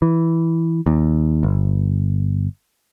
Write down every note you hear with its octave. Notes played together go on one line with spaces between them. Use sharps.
E3
D#2
G1